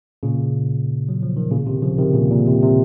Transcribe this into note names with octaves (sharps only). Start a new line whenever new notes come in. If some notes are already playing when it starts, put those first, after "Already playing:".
A#2 C#3
F#3
F3
D#3
A#2 C#3
C3 D#3
C#3 F3
C3 D#3
A#2 C#3
A#2
C3
C3